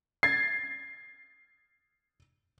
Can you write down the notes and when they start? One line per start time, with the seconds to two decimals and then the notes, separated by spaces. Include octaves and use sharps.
0.23 G#6 A6 C7